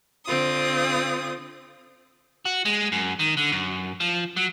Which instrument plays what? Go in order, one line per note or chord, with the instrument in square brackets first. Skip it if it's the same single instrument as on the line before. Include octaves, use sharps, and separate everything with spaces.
[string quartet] D3 C4 F4 D#6
[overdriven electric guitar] F#4
G#3
F#2
D#3
D3
F#2
F3
F#3